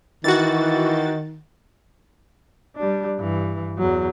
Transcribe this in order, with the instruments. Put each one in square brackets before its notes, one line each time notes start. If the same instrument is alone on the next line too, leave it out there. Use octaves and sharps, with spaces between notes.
[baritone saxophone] D#3 [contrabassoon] E3 [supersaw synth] F#4 A6
[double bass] G3 D4
G2 E3
E2 F#3